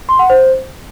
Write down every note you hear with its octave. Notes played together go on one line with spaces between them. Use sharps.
C6
F#5
C5